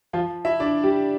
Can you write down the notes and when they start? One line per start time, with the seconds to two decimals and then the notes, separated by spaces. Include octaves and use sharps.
0.13 F3 F4
0.45 E4 E5
0.60 D4 D5
0.84 G3 G4